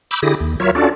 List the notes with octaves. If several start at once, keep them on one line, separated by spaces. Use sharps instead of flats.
B5 D6 E6 G6
D3 E4 G4 G#4 A#6
D#2
F#3 F4 A#4 C#5 E5
C#4 D4 F4 F#4 A4 D5